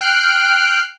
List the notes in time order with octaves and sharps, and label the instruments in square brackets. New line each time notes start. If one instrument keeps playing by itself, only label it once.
[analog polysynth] G5 F6 F#6 C7 D7